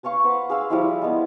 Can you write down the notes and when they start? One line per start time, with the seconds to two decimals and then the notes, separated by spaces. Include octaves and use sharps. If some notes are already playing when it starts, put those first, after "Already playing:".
0.03 B4 C#5 F5 C#6
0.24 B4 C5 F#5
0.50 G#4 F5 E6
0.70 F3 G3 E4
1.02 G#3 B3